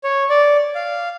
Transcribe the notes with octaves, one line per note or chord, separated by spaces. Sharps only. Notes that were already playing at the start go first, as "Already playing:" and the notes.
C#5
D5
F5